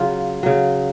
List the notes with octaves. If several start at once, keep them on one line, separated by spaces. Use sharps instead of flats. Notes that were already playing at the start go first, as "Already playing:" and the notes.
Already playing: C#3 F#3 F4
C#3 F#3